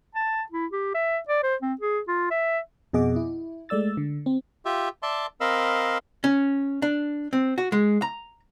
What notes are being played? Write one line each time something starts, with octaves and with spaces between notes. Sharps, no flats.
A5
E4
G4
E5
D5
C5
C4
G#4
F4
E5
F2 B2 G#4 D#5 F#5 D6
E4
G#3 A3 D5 E6 A6
D3
C4
F4 G4 E5
D5 E5 A5 C6
C4 A#4 D#5 F5 B5 E6
C#4
D4
C4
F#4
G#3
A#5